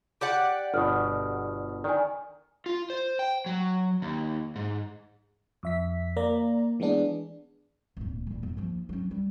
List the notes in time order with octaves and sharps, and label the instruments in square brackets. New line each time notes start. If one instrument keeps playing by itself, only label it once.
[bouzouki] G4 D5 F#5
[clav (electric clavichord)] G1 B2 [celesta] D#6 F6
[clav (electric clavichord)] D#3 [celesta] D5 G#5
[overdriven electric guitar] F4
C5
G5
F#3
D#2
G#2
[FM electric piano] F2 E5 B6
A#3 D5 A#5
E3 G#3 B3 D4 G#4
[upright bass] D1 A#2
A#2 E3
E2
D#2 F3
F#3 C#4
G3